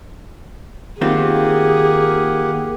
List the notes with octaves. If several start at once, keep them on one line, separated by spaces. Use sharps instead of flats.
D#3 A#3 C4 F4 G4 G#4 F#5